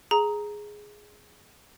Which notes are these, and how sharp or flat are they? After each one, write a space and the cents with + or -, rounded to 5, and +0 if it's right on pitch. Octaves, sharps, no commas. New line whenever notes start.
G#4 +0 A#5 +0